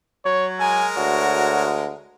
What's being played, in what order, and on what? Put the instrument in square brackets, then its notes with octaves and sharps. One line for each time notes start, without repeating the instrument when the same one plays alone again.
[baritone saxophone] F#3 [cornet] C#5
[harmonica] G#3 A#4 [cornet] G#5
[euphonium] D2 [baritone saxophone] F#4 [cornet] C#5